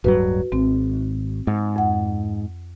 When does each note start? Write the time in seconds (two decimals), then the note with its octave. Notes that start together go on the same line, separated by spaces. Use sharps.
0.04 D1 G2 F#3 F#4 B4
0.52 G#1 C4
1.47 G#2
1.76 F2 F#5